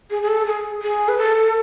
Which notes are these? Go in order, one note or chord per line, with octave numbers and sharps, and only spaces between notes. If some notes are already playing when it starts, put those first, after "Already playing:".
G#4
G#4
A4
G#4
G#4
B4
A4